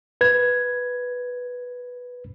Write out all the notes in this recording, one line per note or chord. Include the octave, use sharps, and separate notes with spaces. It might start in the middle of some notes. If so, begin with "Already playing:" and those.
B4 G#6